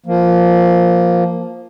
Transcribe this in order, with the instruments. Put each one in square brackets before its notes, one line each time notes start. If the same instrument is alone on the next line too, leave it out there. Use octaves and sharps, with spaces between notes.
[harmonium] F3 A#3